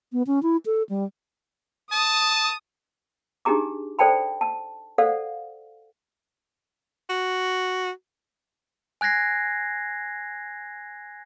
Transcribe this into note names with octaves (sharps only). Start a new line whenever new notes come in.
B3
C#4
E4
A4
G3
A5 D#6
D4 D#4 G4 G#4 A#5 D6
A4 C5 D5 G5 A5 B5
A5
A4 C5 D5 F5 F#5
F#4
G#5 F#6 G#6 A#6 C7